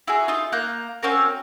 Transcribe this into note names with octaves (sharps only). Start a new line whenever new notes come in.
E4 F#4 G#4
D#4 F4
A#3 A#5 F#6 G6
C4 C#4 F#4 A#4